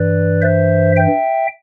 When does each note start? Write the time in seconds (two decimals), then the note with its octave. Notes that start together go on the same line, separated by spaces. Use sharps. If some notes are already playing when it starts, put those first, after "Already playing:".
Already playing: G2 E3 B4 D5
0.42 C5 E5
0.96 E5 G5